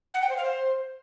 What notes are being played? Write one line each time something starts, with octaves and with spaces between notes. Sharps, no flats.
F#5
G5
C5
F5
C5